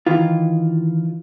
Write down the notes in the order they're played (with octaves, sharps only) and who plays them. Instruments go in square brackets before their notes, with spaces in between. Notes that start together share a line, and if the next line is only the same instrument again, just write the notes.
[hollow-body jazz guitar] D#3 E3 F4